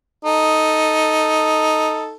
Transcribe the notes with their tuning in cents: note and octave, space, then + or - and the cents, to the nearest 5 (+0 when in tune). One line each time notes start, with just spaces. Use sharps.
D#4 +5 A4 +0